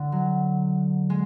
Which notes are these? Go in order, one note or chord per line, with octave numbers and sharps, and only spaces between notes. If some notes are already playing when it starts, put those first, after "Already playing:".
Already playing: D3
F#3
G#3